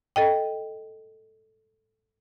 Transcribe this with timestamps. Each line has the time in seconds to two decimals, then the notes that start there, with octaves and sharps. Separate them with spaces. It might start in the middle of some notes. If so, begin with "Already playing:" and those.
0.16 A4 D#5 G5